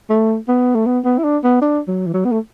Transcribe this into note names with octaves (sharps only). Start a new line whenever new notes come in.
A3
B3
A3
B3
B3
E4
D4
B3
D4
F#3
E3
F#3
B3
A3